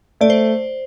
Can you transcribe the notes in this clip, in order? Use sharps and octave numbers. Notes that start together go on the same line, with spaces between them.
A3 D5
C5